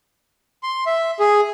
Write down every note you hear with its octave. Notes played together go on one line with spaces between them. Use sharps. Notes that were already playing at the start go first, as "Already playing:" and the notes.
C6
E5
G#4